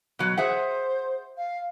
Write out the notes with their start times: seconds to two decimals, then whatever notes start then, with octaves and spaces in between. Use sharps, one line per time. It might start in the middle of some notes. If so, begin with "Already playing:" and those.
0.19 B2 F#3
0.37 G#4 C5 E5 F#5
1.37 F5